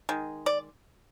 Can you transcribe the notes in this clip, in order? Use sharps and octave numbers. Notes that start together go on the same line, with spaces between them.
D#3 G#3
D5